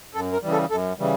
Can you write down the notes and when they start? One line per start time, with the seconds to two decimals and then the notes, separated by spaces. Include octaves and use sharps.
0.14 F#2 A4
0.33 A#4
0.42 C#3 E3 G3
0.52 A4
0.70 F#2 A4
0.99 C#3 E3 G3